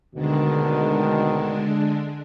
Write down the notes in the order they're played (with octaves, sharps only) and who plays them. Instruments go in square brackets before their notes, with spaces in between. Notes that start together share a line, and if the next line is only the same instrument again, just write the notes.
[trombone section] D2 B2 D#3 [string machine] D3 G#3 D4